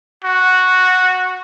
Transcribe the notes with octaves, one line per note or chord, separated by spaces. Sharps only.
F#4